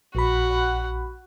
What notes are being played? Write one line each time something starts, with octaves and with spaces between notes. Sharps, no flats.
A#1 F#4 F#5 B5